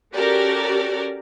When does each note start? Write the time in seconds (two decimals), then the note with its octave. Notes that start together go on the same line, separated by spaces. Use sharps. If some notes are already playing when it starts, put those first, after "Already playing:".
0.15 C#4 F#4 G4 A4 A#4 D5